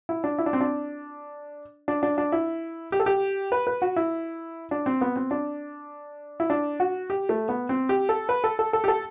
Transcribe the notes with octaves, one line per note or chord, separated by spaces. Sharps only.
E4
D4
E4
D4
C4
D4
D4
D4
D4
E4
G4
A4
G4
B4
B4
F#4
E4
D4
C4
B3
C4
D4
E4
D4
F#4
G4
A3
B3
C4
G4
A4
B4
A4
A4
A4
G4
A4